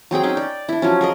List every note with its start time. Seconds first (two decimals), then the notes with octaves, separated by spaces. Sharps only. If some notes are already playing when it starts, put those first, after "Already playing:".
0.11 F#3 C4 G#4 G5
0.23 C#4 D#4 G5
0.37 D5
0.69 D4 E4
0.82 F3 F#3 C#4
1.01 G#4 A#4 D#5